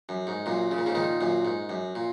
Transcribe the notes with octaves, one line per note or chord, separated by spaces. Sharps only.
F#2
G#2
F#2 A#2
C#3
A#2
G#2 C#3
A#2 D#3
F#2 A#2
G#2
F#2
A#2